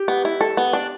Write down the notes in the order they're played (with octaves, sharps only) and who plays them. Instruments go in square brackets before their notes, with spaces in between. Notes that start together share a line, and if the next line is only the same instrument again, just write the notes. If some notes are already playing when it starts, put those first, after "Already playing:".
Already playing: [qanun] G4
[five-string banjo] B3
E4
A4
B3
D4